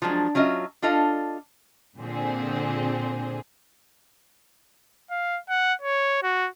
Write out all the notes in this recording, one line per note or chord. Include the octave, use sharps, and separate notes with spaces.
F3 F#3 G#3 D4
F#3 C#4 F4 D#5 E5
D4 F4 A4 D#5 F5
A#2 D3 C4 G#4
F5
F#5
C#5
F#4